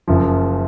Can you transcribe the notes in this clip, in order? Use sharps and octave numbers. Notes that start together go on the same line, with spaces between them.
F#1 F#2 F3